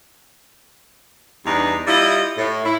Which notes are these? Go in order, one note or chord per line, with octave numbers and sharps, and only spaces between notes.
E2 G2 D4 D#4
G3 E4 F4 D#5
A2
E4